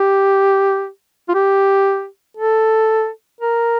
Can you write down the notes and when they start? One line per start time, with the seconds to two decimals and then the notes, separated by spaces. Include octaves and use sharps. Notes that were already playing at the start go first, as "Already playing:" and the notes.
Already playing: G4
1.28 F4
1.34 G4
2.37 A4
3.41 A#4